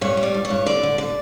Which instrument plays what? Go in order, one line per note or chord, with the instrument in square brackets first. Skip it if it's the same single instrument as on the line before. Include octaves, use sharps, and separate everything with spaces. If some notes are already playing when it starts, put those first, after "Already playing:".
[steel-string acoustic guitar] G2 C#5
G3
D5
G2
C#5
G2
D3 D5
D3
D5